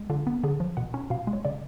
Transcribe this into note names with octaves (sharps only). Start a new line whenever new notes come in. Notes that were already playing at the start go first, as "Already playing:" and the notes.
Already playing: G#3
D3 F4
B3
D3 G#4
F3
B2 F#5
C#4
B2 F5
G#3
C#5
C#3 D5